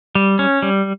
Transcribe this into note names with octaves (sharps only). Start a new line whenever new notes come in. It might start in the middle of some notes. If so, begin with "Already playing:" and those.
G3
C#4
G3